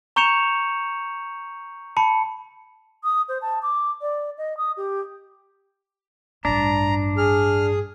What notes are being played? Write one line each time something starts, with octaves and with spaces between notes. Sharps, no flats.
A#5 C#6 G6 C#7 E7 F7
A5 B5 C#7
D#6
C5
A5
D6
D5
D#5
D#6
G4
A1 G2 D4 A#5
G#4 F6